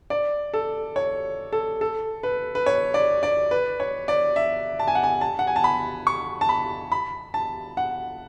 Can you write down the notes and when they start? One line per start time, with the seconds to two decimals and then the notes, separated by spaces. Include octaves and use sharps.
0.10 D5
0.54 A4
0.96 C#5
1.52 A4
1.81 A4
2.23 B4
2.55 B4
2.66 C#5
2.94 D5
3.23 D5
3.51 B4
3.80 C#5
4.08 D5
4.36 E5
4.79 A5
4.88 G#5
4.95 F#5
5.03 G#5
5.21 A5
5.39 F#5
5.47 G#5
5.56 A5
5.64 B5
6.07 C#6
6.41 A5
6.49 B5
6.92 B5
7.34 A5
7.77 F#5